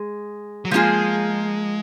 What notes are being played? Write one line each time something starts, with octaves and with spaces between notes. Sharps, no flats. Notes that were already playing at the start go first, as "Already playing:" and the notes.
Already playing: G#3
F#3
F3 G#3 A#3 F4 G#4